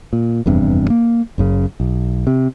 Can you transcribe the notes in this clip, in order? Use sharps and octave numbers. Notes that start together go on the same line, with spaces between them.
A#2
F1 E2 G2 C3
A#3
F#1 F#2 C#3
B1
C3